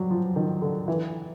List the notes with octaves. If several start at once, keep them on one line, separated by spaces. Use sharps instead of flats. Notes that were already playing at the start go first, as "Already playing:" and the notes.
Already playing: F#3 G3
F3
D#3
D3
E3